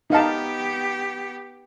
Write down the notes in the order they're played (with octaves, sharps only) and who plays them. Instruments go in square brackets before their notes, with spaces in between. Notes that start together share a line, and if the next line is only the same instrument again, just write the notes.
[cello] B3 G4 [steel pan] D#4 F5 A5